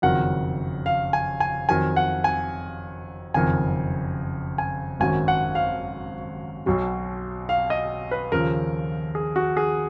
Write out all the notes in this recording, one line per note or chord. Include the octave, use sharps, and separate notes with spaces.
F#1 F2 D#3 F#3 F#5
F5
G#5
G#5
F2 D#3 F#3 G#5
F#5
G#5
F#1 F2 D#3 G#5
G#5
G#1 F#2 D#3 F#3 G#5
F#5
F5
B1 B2 F#3
F5
D#5
B4
D#2 C#3 F3 A#4
G#4
F#4
G#4